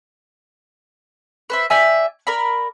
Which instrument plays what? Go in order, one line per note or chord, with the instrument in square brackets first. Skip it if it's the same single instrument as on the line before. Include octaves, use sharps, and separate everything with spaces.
[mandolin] B4 C5 E5
G4 D5 E5 G#5
A#4 D5 A#5 B5